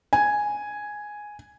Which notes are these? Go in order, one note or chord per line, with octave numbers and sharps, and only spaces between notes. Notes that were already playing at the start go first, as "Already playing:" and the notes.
G#5